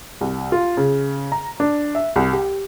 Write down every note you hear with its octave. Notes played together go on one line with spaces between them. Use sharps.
C2
F4
C#3
A#5
D4
E5
C2
G4